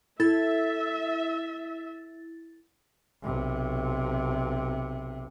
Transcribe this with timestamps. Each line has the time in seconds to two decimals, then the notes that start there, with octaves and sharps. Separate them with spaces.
0.20 E4 A4 E5 A6
3.23 B1 C3